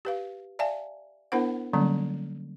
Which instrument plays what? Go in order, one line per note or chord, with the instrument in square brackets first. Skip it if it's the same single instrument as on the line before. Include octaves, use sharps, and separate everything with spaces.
[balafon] G4 B4 F5
D5 E5 F5 G#5 A5
B3 D4 E4 A#4 C5 F#5
D3 F#3 G3 A#3 C#4